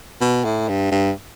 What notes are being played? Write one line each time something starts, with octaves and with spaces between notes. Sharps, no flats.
B2
A2
G2
G2